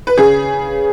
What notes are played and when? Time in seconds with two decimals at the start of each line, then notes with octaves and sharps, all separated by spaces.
0.07 B4
0.18 C#3 G#4